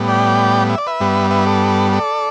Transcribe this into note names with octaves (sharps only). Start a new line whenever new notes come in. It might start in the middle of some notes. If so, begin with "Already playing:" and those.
Already playing: A2 G3 B3
D5 G5
E5
D5
B4 E5
G2 G3 B3
B4 E5
A4 D5
A4 D5